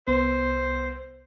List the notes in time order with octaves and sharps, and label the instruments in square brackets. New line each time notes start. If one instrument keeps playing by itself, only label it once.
[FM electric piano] C2 B3 [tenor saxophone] C5